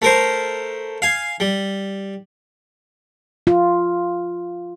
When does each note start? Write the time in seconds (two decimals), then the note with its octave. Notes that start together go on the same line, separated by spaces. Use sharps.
0.02 A3 A#4 C5
1.02 F5 G#5
1.40 G3
3.47 F4